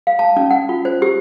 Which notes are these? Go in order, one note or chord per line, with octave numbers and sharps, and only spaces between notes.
F5
A5
C#4
F#5
F4
C5
G4